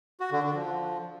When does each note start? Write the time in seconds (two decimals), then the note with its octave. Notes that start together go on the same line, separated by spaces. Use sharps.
0.20 F#4
0.32 D3
0.43 D3
0.55 F3